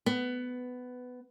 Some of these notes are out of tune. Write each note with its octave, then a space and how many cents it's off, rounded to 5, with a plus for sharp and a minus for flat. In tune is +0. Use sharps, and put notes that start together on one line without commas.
B3 +15